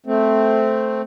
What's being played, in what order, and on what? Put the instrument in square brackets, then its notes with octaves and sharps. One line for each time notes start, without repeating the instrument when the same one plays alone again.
[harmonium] A3 C4